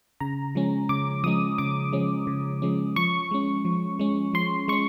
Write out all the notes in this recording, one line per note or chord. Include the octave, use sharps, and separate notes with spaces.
C#3 A#5
F3 G#3 C#4
C#3 D6
F3 G#3 C#4 D#6
C#3 D6
F3 G#3 C#4
C#3
F3 G#3 C#4
F3 C#6
G#3 C#4
F3
G#3 C#4
F3 C6
G#3 C#4 C#6